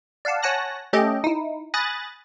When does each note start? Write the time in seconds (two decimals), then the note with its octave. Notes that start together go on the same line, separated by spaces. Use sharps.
0.25 D5 F5 F#5 A5
0.42 C#5 F#5 G#5 A5 F#6 A#6
0.93 A3 C#4 G4 A4 D#5 G5
1.24 D#4 E4
1.74 G#5 B5 D#6 F#6 A6 A#6